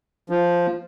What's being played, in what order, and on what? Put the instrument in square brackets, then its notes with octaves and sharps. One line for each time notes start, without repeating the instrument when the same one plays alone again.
[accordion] F3